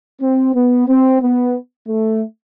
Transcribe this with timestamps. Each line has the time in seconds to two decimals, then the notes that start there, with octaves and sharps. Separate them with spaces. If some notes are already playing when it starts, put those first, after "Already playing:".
0.21 C4
0.55 B3
0.88 C4
1.21 B3
1.87 A3